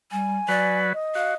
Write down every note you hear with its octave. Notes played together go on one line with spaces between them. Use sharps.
G3 G#5
F#3 B4 D5
D#5
F#4 F5